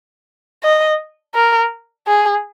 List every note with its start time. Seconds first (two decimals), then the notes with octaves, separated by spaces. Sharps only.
0.64 D#5
1.35 A#4
2.07 G#4